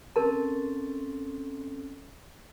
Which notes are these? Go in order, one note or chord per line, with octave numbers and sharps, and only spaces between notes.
C4 C#4 A4 A#4 A5